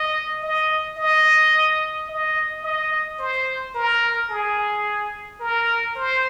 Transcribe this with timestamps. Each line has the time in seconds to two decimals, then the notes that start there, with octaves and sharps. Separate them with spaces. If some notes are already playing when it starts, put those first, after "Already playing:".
Already playing: D#5
0.42 D#5
0.98 D#5
2.09 D#5
2.63 D#5
3.19 C5
3.75 A#4
4.30 G#4
5.40 A#4
5.96 C5